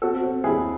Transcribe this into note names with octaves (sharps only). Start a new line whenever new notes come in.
C4 F#4 A4
C4
D#2 E4 G#4